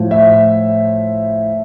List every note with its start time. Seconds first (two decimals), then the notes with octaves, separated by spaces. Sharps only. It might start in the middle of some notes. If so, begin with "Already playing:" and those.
Already playing: A2 F3
0.11 E5